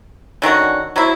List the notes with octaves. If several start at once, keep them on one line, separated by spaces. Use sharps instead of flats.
D3 D#3 C#4 F#4
F#3 A#3 C4 E4